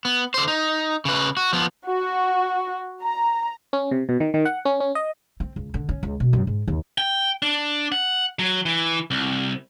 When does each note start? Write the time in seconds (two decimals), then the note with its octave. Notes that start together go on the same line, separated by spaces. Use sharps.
0.05 B3
0.34 D3 C5
0.48 D#4
1.05 C#3 B4
1.37 F#4
1.53 F3 B3
1.87 F#4
3.03 A#5
3.73 C#4
3.91 C3
4.09 B2
4.20 D#3
4.34 D#3
4.45 F#5
4.65 C#4
4.80 C#4
4.95 D#5
5.40 C4
5.56 C#2
5.74 D3
5.89 C#4
6.03 C#2
6.20 B2
6.33 F#2
6.47 G#2
6.68 D#2
6.98 G5
7.43 D4
7.92 F#5
8.39 F#3
8.66 E3
9.11 C2